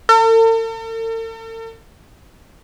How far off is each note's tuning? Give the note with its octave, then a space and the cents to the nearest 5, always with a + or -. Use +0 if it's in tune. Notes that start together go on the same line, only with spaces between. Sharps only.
A4 +45